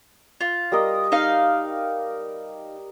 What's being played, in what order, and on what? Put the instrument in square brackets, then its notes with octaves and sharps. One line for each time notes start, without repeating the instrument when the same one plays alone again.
[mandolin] F4
[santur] G3 A#4 D#5
[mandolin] D#4 F5